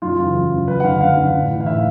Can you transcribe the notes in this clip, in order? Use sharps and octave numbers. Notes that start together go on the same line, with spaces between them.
F#2 F4
C#3 E3
F#2
C#3 E3
F#2 B4
F#5
D3 F5
F#2 F5
D3
A2
E3
F5
A2 E5